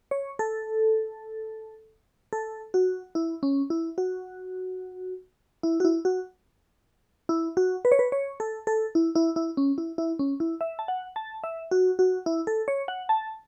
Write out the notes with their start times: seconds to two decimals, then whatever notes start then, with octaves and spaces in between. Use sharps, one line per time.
0.11 C#5
0.39 A4
2.33 A4
2.74 F#4
3.15 E4
3.43 C#4
3.70 E4
3.98 F#4
5.63 E4
5.80 F#4
5.85 E4
6.05 F#4
7.29 E4
7.57 F#4
7.85 B4
7.92 C#5
7.99 B4
8.12 C#5
8.40 A4
8.67 A4
8.95 E4
9.15 E4
9.36 E4
9.57 C#4
9.78 E4
9.98 E4
10.19 C#4
10.40 E4
10.61 E5
10.79 A5
10.88 F#5
11.16 A5
11.44 E5
11.71 F#4
11.99 F#4
12.26 E4
12.47 A4
12.68 C#5
12.88 F#5
13.09 A5